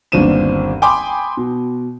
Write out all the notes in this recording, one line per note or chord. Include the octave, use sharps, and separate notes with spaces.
G1 D#2 C4 D4 D#7 E7
G5 G#5 B5 C6 D6 D#6
B2